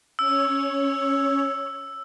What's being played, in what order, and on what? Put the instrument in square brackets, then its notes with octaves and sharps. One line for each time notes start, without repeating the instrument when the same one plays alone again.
[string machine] C#4 C#5 [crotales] E6